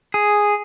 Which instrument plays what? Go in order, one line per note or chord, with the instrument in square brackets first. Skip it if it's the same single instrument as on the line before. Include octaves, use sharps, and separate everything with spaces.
[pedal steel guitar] G#4